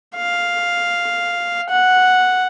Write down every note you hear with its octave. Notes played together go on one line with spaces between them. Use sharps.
F5
F#5